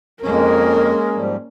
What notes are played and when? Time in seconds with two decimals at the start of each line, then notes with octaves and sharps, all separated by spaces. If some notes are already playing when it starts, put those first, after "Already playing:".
0.23 F2 G#3 A#3 C#4 A#4
1.15 G#2 F3 G3